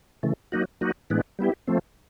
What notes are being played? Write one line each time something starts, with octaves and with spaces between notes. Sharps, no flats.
C#3 E3 A3
F#3 A#3 D#4 F#4
F#3 A#3 D#4 F#4
A2 E3 G#3 B3 D4
G3 B3 E4 G4
F3 A3 C4